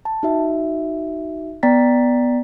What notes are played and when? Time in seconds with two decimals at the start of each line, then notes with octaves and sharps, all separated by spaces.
0.05 A5
0.23 D#4 F#4 E5
1.63 B3 D5 G5 A#5 A6 B6